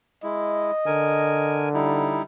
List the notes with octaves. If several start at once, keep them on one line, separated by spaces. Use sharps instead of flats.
G#3 E4 D#5
D3 A#4 G#5
G3 D#4 E4